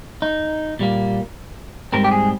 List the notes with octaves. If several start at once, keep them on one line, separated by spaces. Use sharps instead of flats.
D#4
A#2 G3 A#3
G#2 G3 C4 A#4
G4
G#4